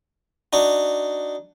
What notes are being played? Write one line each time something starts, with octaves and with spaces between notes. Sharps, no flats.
D4 D#4 F#4